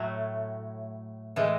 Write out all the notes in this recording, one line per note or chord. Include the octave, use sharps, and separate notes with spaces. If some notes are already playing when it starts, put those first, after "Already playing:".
Already playing: A2 F#3 A3
A2 E3 G#3